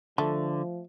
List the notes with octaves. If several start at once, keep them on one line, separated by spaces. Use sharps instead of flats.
D3 F3 A3